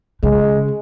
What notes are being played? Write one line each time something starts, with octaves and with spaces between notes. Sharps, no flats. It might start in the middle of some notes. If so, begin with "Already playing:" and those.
C#3 G#3